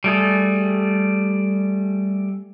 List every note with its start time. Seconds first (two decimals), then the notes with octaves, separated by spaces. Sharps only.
0.04 G3 A3 G#4